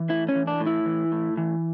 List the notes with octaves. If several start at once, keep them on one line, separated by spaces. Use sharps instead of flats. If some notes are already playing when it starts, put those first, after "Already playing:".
Already playing: E3
A2 E4
C#4
E3
D4
A2
E4
E3
A2
E3